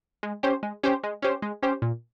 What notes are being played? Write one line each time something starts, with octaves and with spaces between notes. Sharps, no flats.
G#3
C#4 G4 C5
G#3
C#4 G4 C5
G#3
C#4 G4 C5
G#3
C#4 G4 C5
A#2